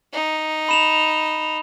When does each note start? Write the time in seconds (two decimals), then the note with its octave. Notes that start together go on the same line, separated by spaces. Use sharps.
0.13 D#4
0.69 B5 E7 F7